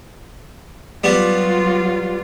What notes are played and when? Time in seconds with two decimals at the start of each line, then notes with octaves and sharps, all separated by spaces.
1.04 F#3 G3 B3 F4